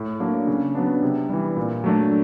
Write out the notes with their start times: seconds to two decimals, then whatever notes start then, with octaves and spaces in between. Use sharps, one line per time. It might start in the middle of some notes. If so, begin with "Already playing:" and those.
Already playing: A2
0.20 F#3 A#3 D4
0.47 C#3
0.75 F#3 B3 D4
1.02 C3
1.29 E3 G3
1.57 A#2
1.84 F#3 A3 D4